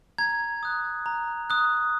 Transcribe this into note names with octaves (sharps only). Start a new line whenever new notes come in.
A#5 G#6
D#6 F#6
A#5
D#6 F#6